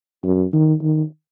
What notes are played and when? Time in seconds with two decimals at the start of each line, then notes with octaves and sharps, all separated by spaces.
0.24 F#2
0.53 D#3
0.82 D#3